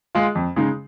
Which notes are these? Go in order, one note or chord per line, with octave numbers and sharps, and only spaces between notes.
G#3 F4
F2
C#3 G#3 D#4